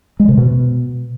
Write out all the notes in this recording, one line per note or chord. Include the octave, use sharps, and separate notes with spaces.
G#3
C3
B2